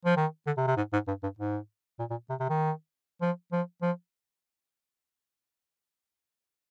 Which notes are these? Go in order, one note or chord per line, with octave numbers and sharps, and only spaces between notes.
F3
D#3
D3
C3
C3
G#2
G#2
G2
G2
G#2
A#2
A#2
C3
C3
D#3
F3
F3
F3